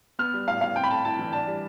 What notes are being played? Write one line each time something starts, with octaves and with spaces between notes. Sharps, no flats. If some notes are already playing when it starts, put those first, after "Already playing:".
B3 F6
G3
A2 F5
A2 F5
C4 G5
B5
A3 A5
E4 A5
E3
D4 A5
G3